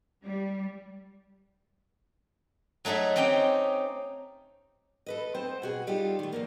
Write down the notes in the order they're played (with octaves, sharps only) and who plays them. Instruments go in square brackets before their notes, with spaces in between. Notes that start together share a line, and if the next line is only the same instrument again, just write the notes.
[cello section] G3
[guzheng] F#3 A3 D#4 G#4 E5
C4 C#4 D#4 G4 G5
[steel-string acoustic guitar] A4 B4 D#5
C4 C5 A5
B2 F#4 G#4
G3 D#4 F4 G4 A4
D#3 A3
E2 G#2 A#3